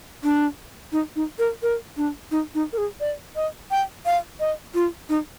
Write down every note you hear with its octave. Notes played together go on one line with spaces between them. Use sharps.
D4
D#4
D#4
A#4
A#4
D4
D#4
D#4
A#4
G#4
D5
D#5
G5
F5
D#5
F4
D#4